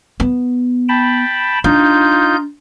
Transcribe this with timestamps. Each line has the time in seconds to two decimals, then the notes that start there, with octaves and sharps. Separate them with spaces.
0.20 B3
0.89 G5 A5 B5
1.64 D4 D#4 F4 G6